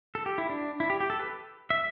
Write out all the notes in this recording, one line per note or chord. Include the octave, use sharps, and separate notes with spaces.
A4
G4
E4
D4
E4
G4
G4
A4
B4
E5